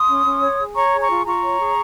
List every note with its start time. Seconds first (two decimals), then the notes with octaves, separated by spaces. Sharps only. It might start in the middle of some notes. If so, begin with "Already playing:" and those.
Already playing: C6 D#6
0.08 C#4
0.24 C#4
0.41 C#5
0.59 G#4
0.75 C#5 A#5 C#6
0.93 G#4
1.01 A#5 C#6
1.10 F4
1.25 F4 A#5 C#6
1.42 C#5
1.59 G#4